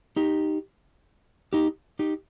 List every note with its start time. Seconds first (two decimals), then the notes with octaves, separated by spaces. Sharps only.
0.16 D#4 G4
1.53 D#4 G4
1.99 D#4 G4